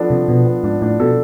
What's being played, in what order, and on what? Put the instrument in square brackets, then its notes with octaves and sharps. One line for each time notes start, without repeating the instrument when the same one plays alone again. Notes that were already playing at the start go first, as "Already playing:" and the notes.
Already playing: [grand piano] F3 B3 D4 A4
[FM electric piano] C3 [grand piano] F3
[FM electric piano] B2 [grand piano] B3
[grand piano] B3
[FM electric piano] G#2 [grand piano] D4
[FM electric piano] A2 [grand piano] D4
[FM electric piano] B2 [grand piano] A4